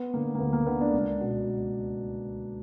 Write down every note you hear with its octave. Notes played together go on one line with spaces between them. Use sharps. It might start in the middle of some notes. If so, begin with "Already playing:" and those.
Already playing: B3
D3 A#3
A#3
D2 B3
A#3
D3 B3
D4
C#2
B2